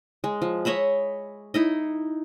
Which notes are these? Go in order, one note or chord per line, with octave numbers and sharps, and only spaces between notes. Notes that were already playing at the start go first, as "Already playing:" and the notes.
G#3
F3
C#5 D#5 E5 B5
D#4 E4 D#5